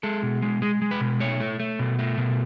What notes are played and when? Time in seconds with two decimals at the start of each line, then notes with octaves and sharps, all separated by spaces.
0.03 G#3 A4
0.23 B2
0.42 G#3
0.62 G#3 G#4
0.82 G#3
0.91 B4
1.01 B2
1.20 A3 C#5
1.40 A3
1.60 A3
1.79 B2
1.99 A3
2.18 B2